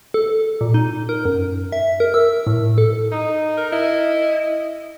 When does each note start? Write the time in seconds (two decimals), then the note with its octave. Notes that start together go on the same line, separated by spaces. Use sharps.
0.14 A4
0.61 A#2
0.74 D#4
1.09 A#4
1.25 F#2
1.72 E5
2.00 A#4
2.14 E6
2.47 A2
2.78 A4
3.12 D#4
3.58 A#4
3.72 E4 D#5